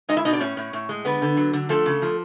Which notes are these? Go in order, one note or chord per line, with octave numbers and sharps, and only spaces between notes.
G#3 D#4 D#5
E4 E5
B2 D#4 D#5
D4 D5
A2 C#4 C#5
A2
A2
G#3
D3 B3 B4
D3
F#3
D3
F3 A3 A4
C#3
F3